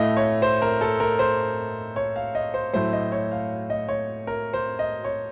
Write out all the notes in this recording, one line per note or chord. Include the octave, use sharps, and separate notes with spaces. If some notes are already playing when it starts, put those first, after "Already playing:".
Already playing: A2 A3 D#5 F5
C#5
C5
A#4
A4
A#4
C5
C#5
F5
D#5
C5
A2 F#3 A3 C5
D#5
C#5
F5
D#5
C#5
A#4
C5
D#5
C#5